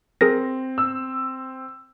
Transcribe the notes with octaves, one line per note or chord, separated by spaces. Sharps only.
C4 G#4 A#4 A#6
E6